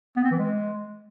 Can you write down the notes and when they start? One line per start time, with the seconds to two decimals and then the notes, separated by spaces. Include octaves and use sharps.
0.17 B3
0.24 C4
0.31 E3
0.39 G#3